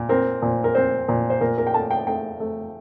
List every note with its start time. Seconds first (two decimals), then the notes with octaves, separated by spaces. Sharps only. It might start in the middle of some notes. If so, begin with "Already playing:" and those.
Already playing: A#2
0.09 C4 A#4
0.42 A#2
0.64 A#4
0.75 C4 C5
1.09 A#2
1.30 C5
1.41 A#2 A#4
1.58 A#4
1.67 G5
1.74 A3 A5
1.91 G5
2.07 A3 G5
2.40 A3